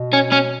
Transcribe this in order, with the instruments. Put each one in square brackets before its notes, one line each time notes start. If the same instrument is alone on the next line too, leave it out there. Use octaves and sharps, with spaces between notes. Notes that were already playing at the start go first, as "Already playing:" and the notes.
Already playing: [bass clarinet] B2
[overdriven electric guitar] C#4
C#4